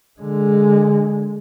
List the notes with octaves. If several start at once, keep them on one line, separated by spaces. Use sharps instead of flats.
D3 G#3